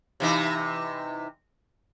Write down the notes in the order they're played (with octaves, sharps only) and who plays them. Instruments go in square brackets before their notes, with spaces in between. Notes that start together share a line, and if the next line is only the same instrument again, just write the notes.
[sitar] C3 E3 D#4